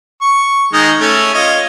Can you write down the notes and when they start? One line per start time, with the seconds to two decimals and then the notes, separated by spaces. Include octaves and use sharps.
0.22 C#6
0.73 D#3 G#3 D#4
1.00 A3 C#4
1.34 F4 C#5 D#5